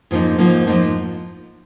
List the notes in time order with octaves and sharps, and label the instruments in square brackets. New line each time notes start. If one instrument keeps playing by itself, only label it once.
[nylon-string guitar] G#2 F3 A#3 D#4
G#2 F3 A#3 D#4
G#2 F3 A#3 D#4